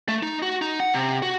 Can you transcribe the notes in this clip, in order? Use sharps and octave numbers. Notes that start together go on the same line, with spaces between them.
A3
D#4
F#4
D#4
F#5
C3
F#4